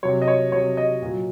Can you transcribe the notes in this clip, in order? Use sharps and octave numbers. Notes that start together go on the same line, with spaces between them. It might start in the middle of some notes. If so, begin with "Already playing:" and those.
C3 F#3 C#5
D#5
C#5
C3 F#3 C#5
D#5
A#2 F#3